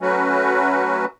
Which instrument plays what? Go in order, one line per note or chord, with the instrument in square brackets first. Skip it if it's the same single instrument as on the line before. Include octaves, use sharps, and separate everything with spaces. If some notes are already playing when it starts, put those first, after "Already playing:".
[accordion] F#3 A3 C#4 F#4 B4